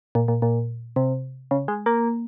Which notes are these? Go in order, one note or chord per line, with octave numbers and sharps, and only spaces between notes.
A#2
A#2
A#2
C3
C#3
G#3
A#3